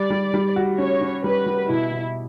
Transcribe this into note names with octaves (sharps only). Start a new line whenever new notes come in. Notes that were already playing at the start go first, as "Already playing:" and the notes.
Already playing: G3 D5
G3
G3
F#4
C#4 C#5
C#4
G3 B4
G3
B2 E4
B2